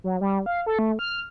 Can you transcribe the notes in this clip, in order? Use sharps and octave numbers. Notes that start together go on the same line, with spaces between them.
F#3
G3
F5
A4
A3
F6